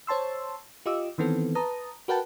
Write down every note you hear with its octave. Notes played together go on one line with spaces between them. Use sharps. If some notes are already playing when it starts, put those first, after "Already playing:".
C5 C#5 A5 C6 E6
F4 G4 D#5 D6 E6
D#3 E3 B3 C4 A4
B4 A5 A#5 D#6
F#4 A#4 B4 F#5 G5 A5